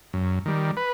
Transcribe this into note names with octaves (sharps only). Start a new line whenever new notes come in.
F#2
D#3 G3
B4